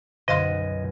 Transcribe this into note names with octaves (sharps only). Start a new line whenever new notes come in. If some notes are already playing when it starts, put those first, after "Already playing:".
B1 F#2 D3 D#5 F5 C6 F#6